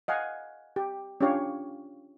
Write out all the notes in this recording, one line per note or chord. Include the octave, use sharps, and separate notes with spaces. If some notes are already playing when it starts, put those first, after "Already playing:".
D#5 F5 F#5 G#5
G4
C#4 D4 F4 G4 C#5 F5